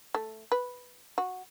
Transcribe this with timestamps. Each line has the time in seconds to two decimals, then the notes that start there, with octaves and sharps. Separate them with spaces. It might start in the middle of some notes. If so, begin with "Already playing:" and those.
0.15 A3
0.52 B4
1.18 F#4